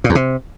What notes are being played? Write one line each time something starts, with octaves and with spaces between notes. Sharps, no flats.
A#2
E2
C3